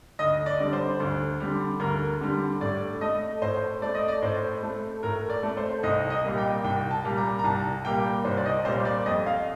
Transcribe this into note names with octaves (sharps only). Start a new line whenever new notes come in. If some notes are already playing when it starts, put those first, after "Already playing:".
D2 D#5
D5
D3 G3
C5
D2
D3 G3
D2 A#4
D3 G3
A2 D5
A3 D#5
A2 C5
A3 D5
D#5
D5
A2 C5
A3
A2 A#4
D5
A3
C5
C2 D#5
D#5
A#2 G3 A#3
G5
C2 G5
A5
A#2 G3 A#3
A#5
A#5
C2 A5
A#2 G3 A#3 G5
C2 C5
D5
D#5
A#2 G3 A#3 C5
D5
F2 D#5
F5